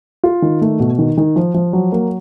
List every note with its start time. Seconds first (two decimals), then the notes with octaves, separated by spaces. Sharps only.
0.24 F4
0.42 D#3
0.61 A3
0.80 B2
0.98 D#3
1.17 D#3
1.36 F3
1.54 F3
1.73 F#3
1.92 A#3